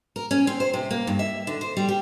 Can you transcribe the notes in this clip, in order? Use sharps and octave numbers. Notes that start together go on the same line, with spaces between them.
A#4
C#4
C4
C5
C3
A#3
G2
E5
D3
C5
G3
G4